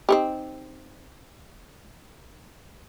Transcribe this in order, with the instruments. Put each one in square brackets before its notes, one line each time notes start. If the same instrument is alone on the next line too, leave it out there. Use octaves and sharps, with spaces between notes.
[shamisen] C4 D#4 G4